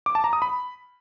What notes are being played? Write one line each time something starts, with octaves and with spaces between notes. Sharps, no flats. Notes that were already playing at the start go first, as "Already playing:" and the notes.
D6
A5
A#5
D#6
B5